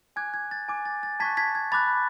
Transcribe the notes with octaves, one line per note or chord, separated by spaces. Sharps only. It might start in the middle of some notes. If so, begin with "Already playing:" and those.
G#5 D6 F#6 G#6
G#6
A6
G#5 D6 F#6
A6
A6
A5 C#6 F#6 G#6 B6
G#6 B6
G#6
B5 D6 F#6 A6